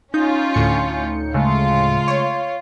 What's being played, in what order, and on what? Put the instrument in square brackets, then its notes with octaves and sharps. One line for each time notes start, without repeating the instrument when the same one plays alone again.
[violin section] C#4 F4 [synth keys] D#4 G6
[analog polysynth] D2 A2 C#7
[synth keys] C#3 G#3 A3 [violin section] F4
[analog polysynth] C#5